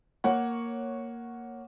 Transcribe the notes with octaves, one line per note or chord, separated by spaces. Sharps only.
A#3 C#5 F#5